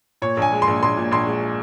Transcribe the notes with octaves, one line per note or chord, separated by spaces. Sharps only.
A#2 C#5
A#1 G#5
G#3
C6
A#1
A#1 C6
A#2
A#1 C6
G#3